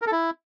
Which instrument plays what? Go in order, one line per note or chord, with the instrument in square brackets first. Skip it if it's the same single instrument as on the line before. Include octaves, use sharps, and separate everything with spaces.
[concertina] A#4
A4
E4